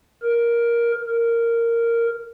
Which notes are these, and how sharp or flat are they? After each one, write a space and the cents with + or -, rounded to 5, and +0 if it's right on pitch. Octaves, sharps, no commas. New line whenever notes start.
A#4 +10
A#4 -10